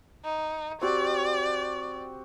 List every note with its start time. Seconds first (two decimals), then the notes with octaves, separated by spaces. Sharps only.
0.25 D#4
0.82 C4 F#4 G4 D5